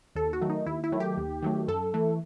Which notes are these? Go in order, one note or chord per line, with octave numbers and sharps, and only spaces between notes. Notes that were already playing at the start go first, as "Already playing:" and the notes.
D#2 A4
F#4
D#3 F#3 A3
D#4
D#2 E4
E4
D#3 F#3 A3
G4
D#2
D#3 F#3 A3
F#2 A4
E3 A3